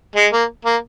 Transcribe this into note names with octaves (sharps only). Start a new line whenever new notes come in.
G#3
A#3
A#3